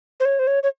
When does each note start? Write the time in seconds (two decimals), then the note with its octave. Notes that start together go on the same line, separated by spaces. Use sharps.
0.20 C5
0.25 C#5
0.39 C5
0.47 C#5
0.63 C#5